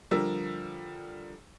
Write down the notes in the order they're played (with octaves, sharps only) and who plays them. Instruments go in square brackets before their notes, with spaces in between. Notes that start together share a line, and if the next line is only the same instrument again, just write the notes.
[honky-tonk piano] D3 F3 G3 A#4 E6